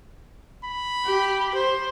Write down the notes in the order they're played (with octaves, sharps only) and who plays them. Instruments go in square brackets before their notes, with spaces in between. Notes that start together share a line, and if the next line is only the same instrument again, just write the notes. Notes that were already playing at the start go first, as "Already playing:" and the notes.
[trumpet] B5
[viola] G4
C5